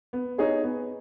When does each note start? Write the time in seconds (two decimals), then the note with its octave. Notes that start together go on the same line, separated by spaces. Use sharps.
0.13 B3
0.38 D#4 G#4 C#5
0.64 B3